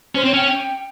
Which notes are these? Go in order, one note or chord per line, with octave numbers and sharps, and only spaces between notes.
C#4 C5
C4 C#5
C#4 G5
G5